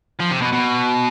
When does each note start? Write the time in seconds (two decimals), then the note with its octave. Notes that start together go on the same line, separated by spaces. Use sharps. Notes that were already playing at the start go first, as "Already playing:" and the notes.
0.19 F3
0.30 C3
0.41 B2
0.52 B2